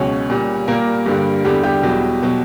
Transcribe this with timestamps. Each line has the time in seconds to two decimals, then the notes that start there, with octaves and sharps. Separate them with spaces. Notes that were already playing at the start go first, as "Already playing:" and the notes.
Already playing: C#2 B2 F#3 C#4 C#5
0.30 A#2 G3
0.68 A#2 G3 A#3 A#4
1.06 G2 D3 G3
1.45 E2 D3 G3 G4
1.63 G3 G4
1.82 E2 B2 F#3
2.23 B2 F#3